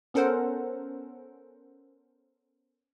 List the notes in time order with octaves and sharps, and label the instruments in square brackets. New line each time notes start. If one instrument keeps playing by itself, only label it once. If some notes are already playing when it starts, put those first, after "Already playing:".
[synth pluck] B3 C#4 A4 A#4 C5 F#5